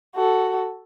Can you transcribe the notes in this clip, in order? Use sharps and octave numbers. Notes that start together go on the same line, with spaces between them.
F#4 A4